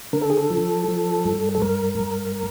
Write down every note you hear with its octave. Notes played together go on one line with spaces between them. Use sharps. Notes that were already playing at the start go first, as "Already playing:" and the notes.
D3 A#4
A4
G#4
A4
F3
F3
G2
A4
G2 A#4
G2